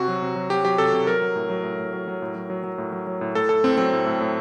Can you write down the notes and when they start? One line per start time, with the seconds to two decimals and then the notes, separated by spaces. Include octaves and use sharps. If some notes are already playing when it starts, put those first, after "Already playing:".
Already playing: C3 F#4
0.08 F#3
0.22 C3
0.36 F#3
0.50 F#3 G4
0.65 F#3 G4
0.78 C3 A4
0.94 C3
1.07 F#3 A#4
1.22 F#3
1.36 A2
1.50 F#3
1.64 A2
1.78 A2
1.93 F#3
2.08 F#3
2.22 A2
2.35 F#3
2.50 F#3
2.64 F#3
2.78 A2
2.92 F#3
3.07 F#3
3.21 A2
3.35 A2 A4
3.49 A2 A4
3.64 A2 C4
3.78 F#3 C4
3.93 A2
4.06 A2
4.20 A2